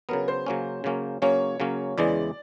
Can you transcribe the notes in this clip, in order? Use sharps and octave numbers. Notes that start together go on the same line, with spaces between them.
C#3 F#3 B3 A#4
C5
C#3 F#3 A#3 C#4
C#3 F#3 A#3 C#4
C#3 F#3 A#3 C#4 C#5
C#3 F#3 A#3 C#4
E2 C#3 E3 G#3 D5